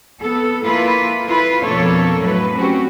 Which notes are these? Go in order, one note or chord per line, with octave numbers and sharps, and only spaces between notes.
B3 A4
A#3 E4 F4 A4 B4
E4 F4 B4
F2 B2 A#3 D4 A4 C#5
A2 F#3 B4
C4 C#4 F#4 G4